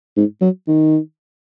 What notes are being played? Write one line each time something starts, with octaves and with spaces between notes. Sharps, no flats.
G#2
F#3
D#3